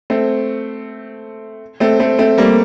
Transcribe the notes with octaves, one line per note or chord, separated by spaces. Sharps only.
A3 C4
A3 C4
A3 C4
A3 C4
G3 A#3